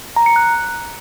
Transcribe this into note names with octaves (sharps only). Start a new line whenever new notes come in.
A#5
C#7
F#6